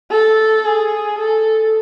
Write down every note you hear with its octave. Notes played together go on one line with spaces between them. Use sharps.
A4
G#4
A4